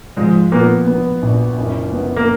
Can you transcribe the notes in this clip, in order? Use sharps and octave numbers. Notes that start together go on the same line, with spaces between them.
G#2 F3 G#3
A#2 A#3 B3
B3
A#1
F#1
B3
A#3